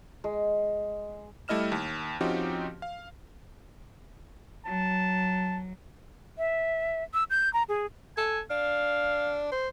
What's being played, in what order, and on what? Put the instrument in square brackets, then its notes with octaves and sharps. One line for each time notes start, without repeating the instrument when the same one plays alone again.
[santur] G#3
[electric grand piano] G3 A3 E4 D#5 F6 E7
D#2
F3 C4 C#4 D#4 F#4 G4
F5
[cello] F#3 [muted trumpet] A5
[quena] E5
E6
G6
A#5
G#4
[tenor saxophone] A4 [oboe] G#5
[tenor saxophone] D4 [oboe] F5
[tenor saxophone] C5